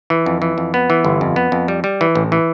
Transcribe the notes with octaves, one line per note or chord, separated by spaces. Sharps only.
E3
F2
E3
F2
B3
E3
G1
F2
B3
F2
G3
G3
E3
A1
E3